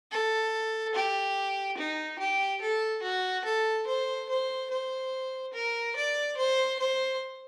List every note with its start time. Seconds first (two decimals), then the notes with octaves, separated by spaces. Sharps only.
0.11 A4
0.95 G4
1.77 D#4
2.19 G4
2.61 A4
3.03 F#4
3.45 A4
3.87 C5
4.29 C5
4.70 C5
5.54 A#4
5.96 D5
6.37 C5
6.79 C5